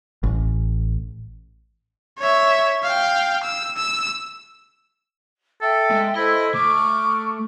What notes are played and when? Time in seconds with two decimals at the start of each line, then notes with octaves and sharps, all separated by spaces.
0.23 A1
2.18 C#5 E5
2.83 F5 G5
3.43 E6
3.77 E6
5.61 A4 E5 G5
5.91 G#3
6.16 E4 A4 C5 D#5 E6
6.55 A3 C#6 D6 F6